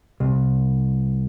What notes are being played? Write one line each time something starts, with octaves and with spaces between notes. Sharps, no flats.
C2